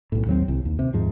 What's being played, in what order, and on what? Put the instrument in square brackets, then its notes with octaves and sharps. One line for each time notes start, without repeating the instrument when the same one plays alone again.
[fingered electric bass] B1 A2
D#2 F#3 C4
C2
D#2
C3
D#2 G#2 F3